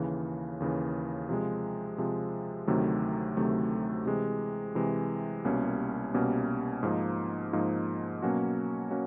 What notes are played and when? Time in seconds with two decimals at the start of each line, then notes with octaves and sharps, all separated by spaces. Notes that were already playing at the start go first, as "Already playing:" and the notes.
Already playing: D#2 C#3 E3
0.60 D#2 C#3 E3
1.29 C3 F3 G#3
1.98 C3 F3 G#3
2.67 D2 C3 D#3 F#3 A3
3.37 D2 C3 D#3 F#3 A3
4.06 C3 E3 G#3
4.75 C3 E3 G#3
5.45 C2 B2 G3 A#3 C#4
6.14 C2 B2 G3 A#3 C#4
6.83 G#2 F3 A#3 D#4
7.53 G#2 F3 A#3 D#4
8.22 B2 F#3 A#3 C#4 F#4
8.91 A#3 C#4 F#4